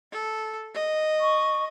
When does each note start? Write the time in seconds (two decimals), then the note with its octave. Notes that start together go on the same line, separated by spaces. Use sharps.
0.12 A4
0.74 D#5
1.20 C#6